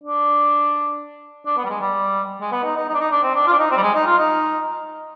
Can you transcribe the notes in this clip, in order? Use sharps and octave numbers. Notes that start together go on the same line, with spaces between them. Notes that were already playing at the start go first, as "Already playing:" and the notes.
D4
D4
B3
G3
G#3
G3
G#3
B3
D#4
D#4
D#4
D4
D#4
D4
C4
D4
F4
D4
D#4
C4
G3
G#3
D#4
F4
D#4